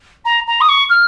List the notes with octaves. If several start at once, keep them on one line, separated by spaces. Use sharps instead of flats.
A#5
A#5
D#6
C#6
F6